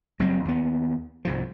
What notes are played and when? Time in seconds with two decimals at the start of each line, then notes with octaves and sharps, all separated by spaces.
0.19 F#1 F#3 G3 C4
0.45 D#2 B3
1.25 C2 G#2 F3